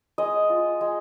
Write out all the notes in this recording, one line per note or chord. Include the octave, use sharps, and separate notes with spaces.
G#3 D#5
F4
G#3